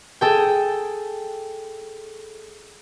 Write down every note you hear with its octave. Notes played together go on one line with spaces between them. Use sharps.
G#4 A4 G5